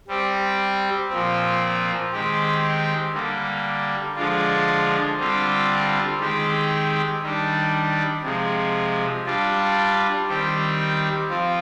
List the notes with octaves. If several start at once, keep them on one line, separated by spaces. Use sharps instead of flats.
G3 C4 G4
A#2 F3 C4
D#3 G#3 C4 G4
D3 G3 A#3
D3 F3 G#3 D4 F4
D3 G3 C4 F4
D#3 G#3 C4 G4
D#3 G3 D4
C3 F3 G#3
G3 D4 F4
D#3 G3 C4 G4
F3 C4 F4